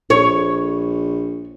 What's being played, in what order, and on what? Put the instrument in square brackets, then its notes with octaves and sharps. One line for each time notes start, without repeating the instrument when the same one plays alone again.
[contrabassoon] A#1 [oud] C#5